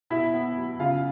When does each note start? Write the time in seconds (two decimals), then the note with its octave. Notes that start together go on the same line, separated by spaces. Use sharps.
0.10 B2 E4 E5
0.34 B3
0.57 F#3
0.79 C#3 F4 F5